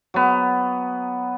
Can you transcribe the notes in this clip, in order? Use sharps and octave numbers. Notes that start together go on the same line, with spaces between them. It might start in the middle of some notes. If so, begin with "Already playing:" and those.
F#3 B3